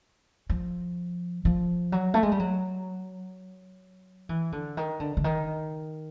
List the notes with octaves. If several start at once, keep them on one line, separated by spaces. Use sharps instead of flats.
F3
F3
F#3
A3
G#3
G3
F#3
E3
D3
D#3
D3
D3
D#3